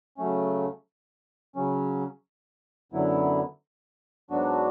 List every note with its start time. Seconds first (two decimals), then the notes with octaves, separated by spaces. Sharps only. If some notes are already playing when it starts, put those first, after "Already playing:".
0.18 C#3 F#3 A3 C#4
1.56 C#3 F#3 C#4
2.92 F#2 D3 F#3 B3 E4
4.30 G#2 F#3 B3 D4 F#4